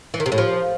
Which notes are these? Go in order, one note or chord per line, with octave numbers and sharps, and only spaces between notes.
E3
D#3
C3
A2
F3